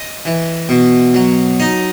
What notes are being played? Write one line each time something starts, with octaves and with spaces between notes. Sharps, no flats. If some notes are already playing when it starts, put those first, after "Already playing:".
Already playing: D#5
E3
B2
F#3
D#4 D#5